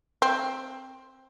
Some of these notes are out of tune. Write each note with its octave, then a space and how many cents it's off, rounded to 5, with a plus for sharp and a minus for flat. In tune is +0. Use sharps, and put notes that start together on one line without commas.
C4 +10